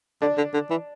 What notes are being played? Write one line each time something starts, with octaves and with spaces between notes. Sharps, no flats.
D3 D4
D3
D3
E3